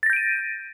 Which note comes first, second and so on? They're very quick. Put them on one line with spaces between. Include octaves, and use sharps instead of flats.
A6 A#6 G6 D7 D#7